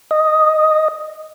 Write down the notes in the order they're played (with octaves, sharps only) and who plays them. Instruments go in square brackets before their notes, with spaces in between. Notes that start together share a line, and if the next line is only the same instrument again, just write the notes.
[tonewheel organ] D#5